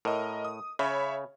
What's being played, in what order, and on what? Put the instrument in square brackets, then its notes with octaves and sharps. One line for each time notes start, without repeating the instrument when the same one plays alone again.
[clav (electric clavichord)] A2 [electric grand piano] A#4 D#5
[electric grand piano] D#6
[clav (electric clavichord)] C#3 [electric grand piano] C#5 E5 B5